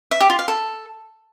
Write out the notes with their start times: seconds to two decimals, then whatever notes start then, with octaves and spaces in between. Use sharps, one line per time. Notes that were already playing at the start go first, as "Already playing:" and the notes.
0.11 E5
0.20 G4
0.30 F4
0.39 F5
0.48 A4